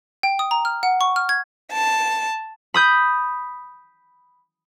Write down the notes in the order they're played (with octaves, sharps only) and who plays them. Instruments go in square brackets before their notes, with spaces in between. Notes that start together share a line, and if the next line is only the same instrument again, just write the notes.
[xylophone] G5
D#6
A#5
F6
F#5
C#6
F6
G#6
[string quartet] A5
[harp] B5 D#6 G6